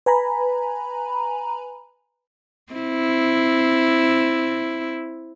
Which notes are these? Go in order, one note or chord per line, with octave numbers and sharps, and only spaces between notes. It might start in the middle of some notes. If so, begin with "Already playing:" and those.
B4 G#5 A#5 B5
C4 E4